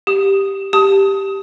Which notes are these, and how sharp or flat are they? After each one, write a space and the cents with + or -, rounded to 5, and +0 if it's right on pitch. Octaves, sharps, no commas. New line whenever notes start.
G4 +0 D#6 +0
G4 +0 A5 +0 D#6 +25